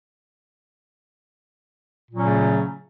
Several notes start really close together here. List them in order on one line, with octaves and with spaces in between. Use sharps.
A#2 F#3 C#4 C#3 A3